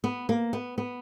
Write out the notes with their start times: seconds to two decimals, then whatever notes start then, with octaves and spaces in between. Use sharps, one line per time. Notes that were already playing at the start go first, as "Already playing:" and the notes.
0.04 B3
0.29 A#3
0.53 B3
0.78 B3